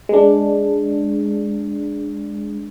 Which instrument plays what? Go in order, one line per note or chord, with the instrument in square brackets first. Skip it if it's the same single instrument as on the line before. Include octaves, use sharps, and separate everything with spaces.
[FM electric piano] G#3 D4